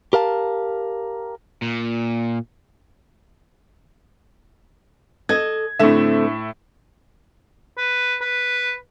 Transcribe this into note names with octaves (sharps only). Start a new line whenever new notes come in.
G4 A#4 F5 A5
A#2
A4 D#5 G#6
A2 D3 A3 C4 E5
B4
B4